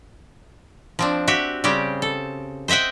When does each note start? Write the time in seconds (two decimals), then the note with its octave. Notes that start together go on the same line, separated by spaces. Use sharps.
0.99 F3 C4 D4
1.28 F#4 G4 E5
1.64 C#3 G3 C4 G4
2.02 A4
2.68 C5 D#5 E5 F#5 G5